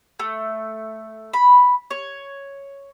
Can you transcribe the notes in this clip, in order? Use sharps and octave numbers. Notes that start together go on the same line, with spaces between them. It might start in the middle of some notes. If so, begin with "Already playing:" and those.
A3
B5
C#5